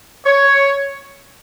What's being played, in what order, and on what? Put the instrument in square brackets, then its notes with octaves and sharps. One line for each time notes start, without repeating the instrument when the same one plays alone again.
[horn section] C#5